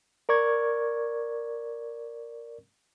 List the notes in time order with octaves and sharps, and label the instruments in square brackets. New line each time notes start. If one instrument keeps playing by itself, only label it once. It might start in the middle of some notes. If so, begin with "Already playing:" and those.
[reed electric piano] A#4 D5 C#6 G#6